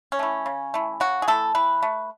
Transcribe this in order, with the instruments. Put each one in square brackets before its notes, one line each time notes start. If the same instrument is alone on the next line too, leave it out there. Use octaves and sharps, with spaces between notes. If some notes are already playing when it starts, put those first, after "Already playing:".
[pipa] C#4
E3 A3
C#3
E3 A3
C#3 F#4
G#4
E3 A3 A4
E3 B4
A3